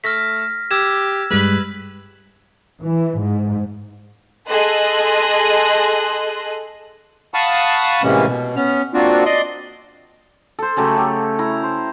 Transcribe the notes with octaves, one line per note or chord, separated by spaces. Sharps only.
A3 F6 A#6 B6
G4 E6 G#6 E7
G2 G3 G#3 B4
E3
G#2
G#4 A4 D#5 C6 F#6
F5 F#5 A5 B5 C#6 D#6
A2 C3 E3 G#3 A#3 C#4
B2
B3 C#4 F6
A#3 C4 D4 F4 F#4
D5 D#5 C6
A4 C5
C#3 F#3 A3 G4
G4
E4 A#5
C5